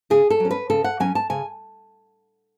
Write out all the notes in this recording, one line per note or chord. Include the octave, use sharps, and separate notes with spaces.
C#3 G#4
A4
F#3 C#4
B4
C#3 A4
F#5
F#3 C#4 G#5
A5
C#3 G#5